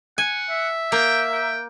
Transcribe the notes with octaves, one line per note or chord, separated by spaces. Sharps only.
F#5 G#5
E5
A#3 G5
G5